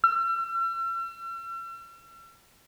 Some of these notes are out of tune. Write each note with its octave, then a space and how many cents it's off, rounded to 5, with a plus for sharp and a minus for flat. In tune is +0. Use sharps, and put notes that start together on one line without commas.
E6 +45